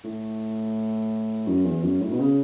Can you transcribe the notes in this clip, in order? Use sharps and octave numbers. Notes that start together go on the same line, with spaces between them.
A2
F#2
E2
F#2
A2
B2
C#3